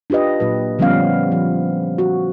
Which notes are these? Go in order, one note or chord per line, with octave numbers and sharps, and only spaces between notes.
D4 F4 G4 B4 D#5
A#2 F#3 B4
D3 F3 G3 B3 C#4 F5
F3
F#4